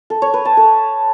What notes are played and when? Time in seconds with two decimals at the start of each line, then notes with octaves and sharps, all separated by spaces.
0.10 A4
0.22 C#5
0.34 B4
0.45 A5
0.57 A4